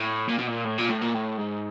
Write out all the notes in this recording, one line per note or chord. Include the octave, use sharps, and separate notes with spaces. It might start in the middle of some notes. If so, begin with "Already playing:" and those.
Already playing: A2
A#2
B2
A#2
A2
A#2
A2
A#2
A2
G#2